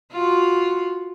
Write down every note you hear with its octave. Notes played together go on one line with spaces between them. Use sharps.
F4 F#4